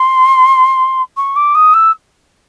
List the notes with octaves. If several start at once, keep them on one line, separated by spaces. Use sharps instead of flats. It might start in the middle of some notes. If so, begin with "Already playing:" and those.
Already playing: C6
C#6
D6
D#6
E6